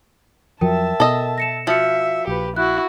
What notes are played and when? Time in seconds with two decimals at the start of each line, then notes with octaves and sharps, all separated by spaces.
0.61 F2 F3 F#3 A#4 E5 G5 A5
1.00 B2 A4 D#5
1.38 A#6 C#7 E7
1.67 F3 F#4 E5 C#7
2.27 A#1 G4 B4
2.56 E4 F#4 F#6